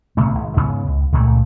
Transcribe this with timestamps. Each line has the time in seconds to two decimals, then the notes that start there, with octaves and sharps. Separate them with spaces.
0.17 A1 C3 A3 B3
0.35 G#1
0.57 G#2 C#3 B3
0.87 C#2
1.12 C#2 A#2 F#3 A3